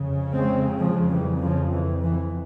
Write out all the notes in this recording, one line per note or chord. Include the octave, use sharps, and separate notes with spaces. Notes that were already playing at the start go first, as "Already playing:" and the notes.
Already playing: F2 C#3
G#3 C4
F3 G#3
E3 G3
C#3 F3
E3
E3